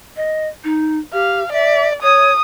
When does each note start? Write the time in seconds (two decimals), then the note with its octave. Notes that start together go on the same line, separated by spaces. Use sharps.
0.16 D#5
0.64 D#4
1.13 G4 F5
1.52 D5 E5
2.02 C#5 D#6